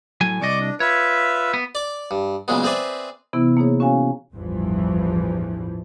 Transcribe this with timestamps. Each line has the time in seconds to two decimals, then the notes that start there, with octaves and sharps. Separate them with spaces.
0.21 A2 F#3 G#5
0.41 C2 D5 D#5 C#6 D6
0.60 D4
0.80 F4 B4 C#5 E5
1.54 B3
1.75 D5 D6
2.11 G2
2.48 A#2 C#3 F#3 G#3 B3
2.63 C4 G#4 B4 D5 E5
3.33 C3 E3 B3 E4 B5
3.57 A#3 D#4 G#4 C#5
3.80 C#4 F#4 C#5 F5 G#5
4.33 A1 E2 G2 E3 F3